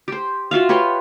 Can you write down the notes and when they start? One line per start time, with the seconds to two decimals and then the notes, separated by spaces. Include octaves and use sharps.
0.08 G4 C5
0.51 F4 F#4 E5 F5
0.69 G4 B4 C#5 C6